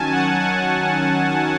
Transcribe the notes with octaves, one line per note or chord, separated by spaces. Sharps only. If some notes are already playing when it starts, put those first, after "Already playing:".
Already playing: D#3 F#3 C#4 G#5 A5
F#5
G#5